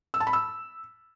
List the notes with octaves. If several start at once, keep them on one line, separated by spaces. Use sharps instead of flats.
E6
A5
B5
E6